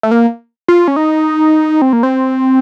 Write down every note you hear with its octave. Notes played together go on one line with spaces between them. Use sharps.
A3
A#3
F4
C#4
D#4
C4
A#3
C4